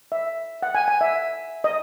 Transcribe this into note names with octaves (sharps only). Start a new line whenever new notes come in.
E5
F#5
G#5
G#5
E5
D#5